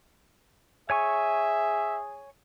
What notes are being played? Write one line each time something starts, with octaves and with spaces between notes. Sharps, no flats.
G#4 C#5 E5 G#5 C#6